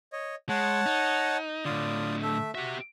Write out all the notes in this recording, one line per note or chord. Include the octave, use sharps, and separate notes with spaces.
C#5 D#5
G#3 C#5 F#5 A5
D#4
A2 D3 F4 D5 D#6
A3 E5
F#4 G4 E5